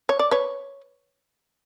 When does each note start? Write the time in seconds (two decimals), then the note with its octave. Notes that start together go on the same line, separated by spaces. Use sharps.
0.09 C#5
0.19 D5
0.31 B4 C#5